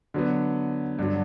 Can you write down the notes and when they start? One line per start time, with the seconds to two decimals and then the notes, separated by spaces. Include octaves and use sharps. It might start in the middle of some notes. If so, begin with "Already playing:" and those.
0.14 D3 F#3 B3
0.99 G2 D3 F#3